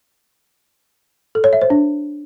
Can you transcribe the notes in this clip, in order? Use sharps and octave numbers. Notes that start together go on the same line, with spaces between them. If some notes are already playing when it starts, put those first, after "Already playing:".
A4
C#5
E5
C5
D4